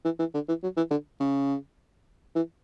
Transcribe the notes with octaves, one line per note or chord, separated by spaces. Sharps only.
E3
E3
D3
E3
F#3
E3
D3
C#3
E3